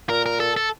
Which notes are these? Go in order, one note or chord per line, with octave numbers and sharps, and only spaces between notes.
A#2 A#4
A#4
A4
A4